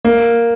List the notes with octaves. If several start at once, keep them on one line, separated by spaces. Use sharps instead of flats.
A#3